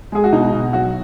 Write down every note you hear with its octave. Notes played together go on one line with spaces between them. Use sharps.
G#3 G#4
F#4
B2 D#4
B2
F#3 F#4